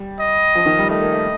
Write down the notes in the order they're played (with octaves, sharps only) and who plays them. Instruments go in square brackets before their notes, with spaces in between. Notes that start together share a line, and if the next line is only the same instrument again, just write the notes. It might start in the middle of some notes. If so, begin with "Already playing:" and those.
Already playing: [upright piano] G3
[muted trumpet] D#5
[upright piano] F3
D#3
G3
[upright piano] A3 [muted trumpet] D#5
[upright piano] A#3
A3